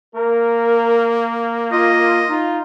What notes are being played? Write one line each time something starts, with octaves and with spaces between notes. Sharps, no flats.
A#3 A#4
F4 D#5
D#4 F4